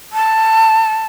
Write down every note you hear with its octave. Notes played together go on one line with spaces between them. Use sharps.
A5